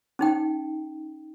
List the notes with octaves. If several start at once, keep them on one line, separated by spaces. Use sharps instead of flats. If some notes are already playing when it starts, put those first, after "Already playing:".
C#4 D#4 G5